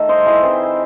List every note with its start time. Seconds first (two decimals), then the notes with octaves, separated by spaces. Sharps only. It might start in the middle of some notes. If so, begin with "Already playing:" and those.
Already playing: D#3 A3 D#4 A4
0.09 C5 D#5
0.26 E4 G#4
0.43 E3 C4 D#4